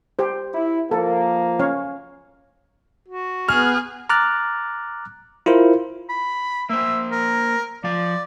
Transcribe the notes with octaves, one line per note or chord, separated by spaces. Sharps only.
G4 C5
E4
F3 A#3 A4
C#4 C#5 F5
F#4
B3 G#4 F6
A#5 D6 F6 F#6 A6
E4 F4 A#4 C5
B5
A#3 C5 E5
A#4
F3 D5 F5